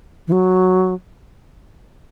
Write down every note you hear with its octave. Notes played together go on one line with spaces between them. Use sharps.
E3
F#3